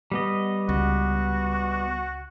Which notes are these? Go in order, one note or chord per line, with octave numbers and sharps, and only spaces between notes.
G3 B3 D#5
C#2 F#4